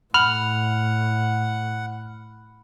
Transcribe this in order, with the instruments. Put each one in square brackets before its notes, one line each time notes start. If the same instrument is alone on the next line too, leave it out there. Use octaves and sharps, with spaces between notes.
[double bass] A2 [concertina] F#5 [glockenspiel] B5 [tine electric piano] F6